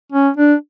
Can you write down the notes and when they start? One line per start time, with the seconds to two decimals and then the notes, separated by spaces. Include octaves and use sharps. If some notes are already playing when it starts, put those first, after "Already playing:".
0.12 C#4
0.37 D4